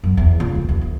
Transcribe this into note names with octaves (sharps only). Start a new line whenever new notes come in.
F#2
E2
C#2
F2
D#2
D2